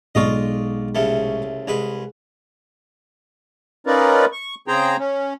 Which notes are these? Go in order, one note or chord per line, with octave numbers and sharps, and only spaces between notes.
B1 G#3 D4 F4 D#5 C#6
C2 C#3 A3
C2 G#3 G#4 B4
C#4 D#4 F4 A#4 B4 D5
C#6
C#3 C4 G#4 C5 G5 A#5
C#4